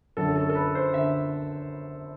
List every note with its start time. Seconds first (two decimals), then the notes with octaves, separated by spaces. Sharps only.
0.17 F#2 D3 F#3 A4
0.36 A4
0.50 A4
0.55 B4
0.75 C5
0.94 D3 E5